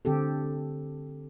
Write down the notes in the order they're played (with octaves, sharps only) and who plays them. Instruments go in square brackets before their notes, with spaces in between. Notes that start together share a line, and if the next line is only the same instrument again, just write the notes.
[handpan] D3 C4 G4 A4